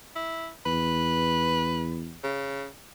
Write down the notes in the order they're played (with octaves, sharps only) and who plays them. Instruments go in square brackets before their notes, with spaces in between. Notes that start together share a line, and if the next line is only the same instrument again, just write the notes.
[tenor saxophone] E4
[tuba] E2 [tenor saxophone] B4
[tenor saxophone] C#3